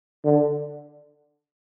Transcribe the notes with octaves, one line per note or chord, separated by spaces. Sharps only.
D3